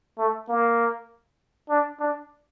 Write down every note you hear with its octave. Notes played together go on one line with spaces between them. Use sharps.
A3
A#3
D4
D4